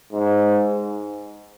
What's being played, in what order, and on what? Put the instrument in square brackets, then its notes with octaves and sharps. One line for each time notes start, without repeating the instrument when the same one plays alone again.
[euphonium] G#2